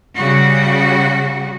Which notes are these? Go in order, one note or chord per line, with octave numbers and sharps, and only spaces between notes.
C#3 G3 F#4